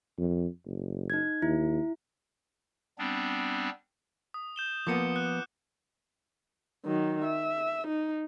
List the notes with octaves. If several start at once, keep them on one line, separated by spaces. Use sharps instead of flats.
F2
F#1
D#4 G#6
D#2 E4
G3 B3 C4 D4
D#6
G6 E7 G7
F3 A#3 B3 D6 C#7
F#6
D#3 F#3
E5
D#4